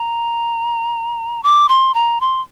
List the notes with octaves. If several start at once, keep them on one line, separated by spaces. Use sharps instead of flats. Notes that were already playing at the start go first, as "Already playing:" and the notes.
Already playing: A#5
D6
C6
A#5
C6